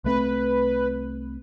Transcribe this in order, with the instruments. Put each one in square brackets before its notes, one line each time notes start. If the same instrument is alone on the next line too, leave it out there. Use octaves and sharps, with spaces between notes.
[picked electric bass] C2 A3 C4 [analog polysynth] B4